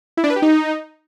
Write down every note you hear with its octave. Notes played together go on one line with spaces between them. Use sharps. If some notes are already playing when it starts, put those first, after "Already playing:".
E4
D4
B4
G4
D#4